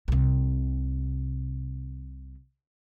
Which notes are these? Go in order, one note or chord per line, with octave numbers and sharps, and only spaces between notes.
C2 C3